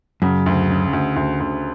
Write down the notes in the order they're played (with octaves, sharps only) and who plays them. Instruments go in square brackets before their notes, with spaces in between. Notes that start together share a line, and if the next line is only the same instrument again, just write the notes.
[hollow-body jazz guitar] F#2 [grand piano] C#3
[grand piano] D2
C#3
D2
D2
D2